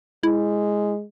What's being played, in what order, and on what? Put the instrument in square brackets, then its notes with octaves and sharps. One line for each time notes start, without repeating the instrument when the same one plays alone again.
[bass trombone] G#3 [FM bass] E4